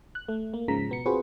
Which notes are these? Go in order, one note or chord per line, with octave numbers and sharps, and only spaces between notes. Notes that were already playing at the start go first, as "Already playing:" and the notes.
F#6
A3
A#3
G#2 C#3 F3 G#3 A#5 B6
B2 B3 C#7
C4 F4 F#4 G#4 B4 C5